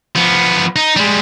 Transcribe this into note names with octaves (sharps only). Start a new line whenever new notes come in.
F3 B3
D#4
G3 G#3